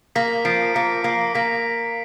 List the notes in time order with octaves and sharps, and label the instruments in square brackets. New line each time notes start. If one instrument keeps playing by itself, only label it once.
[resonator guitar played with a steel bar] A#3 [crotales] B6
[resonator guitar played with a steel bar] F3 [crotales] C7 D7
[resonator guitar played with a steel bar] A#3 [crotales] B6 C#7
[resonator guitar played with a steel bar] A#3 [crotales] C7
[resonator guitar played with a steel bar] A#3 [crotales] B6